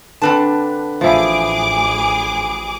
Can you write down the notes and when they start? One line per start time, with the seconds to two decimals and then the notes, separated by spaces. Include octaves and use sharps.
0.22 D3 C4 D4 B4 A5
1.01 A1 F3 E4 G#4 D6